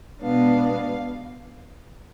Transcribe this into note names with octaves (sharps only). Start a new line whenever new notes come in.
B2 G#3 B3 D4 F5